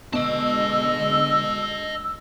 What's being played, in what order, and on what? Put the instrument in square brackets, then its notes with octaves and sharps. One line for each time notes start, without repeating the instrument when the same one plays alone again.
[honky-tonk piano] B2 [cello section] D3 G#3 [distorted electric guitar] D#5 A5 [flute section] E6